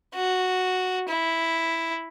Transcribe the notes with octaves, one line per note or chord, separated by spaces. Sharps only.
F#4
E4